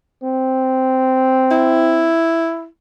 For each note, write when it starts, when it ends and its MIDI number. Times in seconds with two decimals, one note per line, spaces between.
0.24 2.14 60
1.51 2.66 64